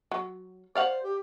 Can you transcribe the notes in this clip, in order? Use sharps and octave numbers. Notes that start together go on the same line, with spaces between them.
F#3
C5 D5 F5 F#5
G4